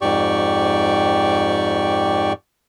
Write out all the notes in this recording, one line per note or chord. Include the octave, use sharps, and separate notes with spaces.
F2 G#2 G4 D5 C#6